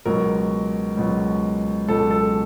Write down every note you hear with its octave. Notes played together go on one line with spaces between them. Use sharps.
C#2 B2 F#3 A#4
C#2 B2 F#3
C#2 B2 F#3 A4
A4